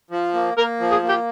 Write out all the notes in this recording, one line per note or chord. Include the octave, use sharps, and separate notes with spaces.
F3
A#3
A#3 A#4
F3
G#4
A#3
G4